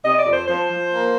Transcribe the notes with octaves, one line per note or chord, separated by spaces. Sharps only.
C3 D#5
D5
F2
C5
F3 C5
F3
A#3